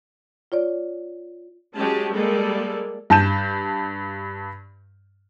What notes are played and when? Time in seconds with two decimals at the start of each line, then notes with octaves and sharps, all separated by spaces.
0.52 F4 C#5 D5
1.75 F#3 G#3 C#4 G4 A5
2.14 G3 G#3 A#3 A4 D5
3.10 G2 A5 G6 E7